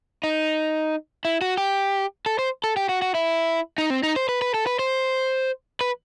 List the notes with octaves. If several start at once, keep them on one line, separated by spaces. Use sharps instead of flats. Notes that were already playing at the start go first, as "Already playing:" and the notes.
D#4
E4
F#4
G4
A4
C5
A4
G4
F#4
F#4
E4
D#4
C4
D#4
C5
B4
B4
A4
B4
C5
B4